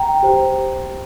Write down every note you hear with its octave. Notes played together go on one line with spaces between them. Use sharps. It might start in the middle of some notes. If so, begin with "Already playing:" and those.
Already playing: G5 A#5
G4 C5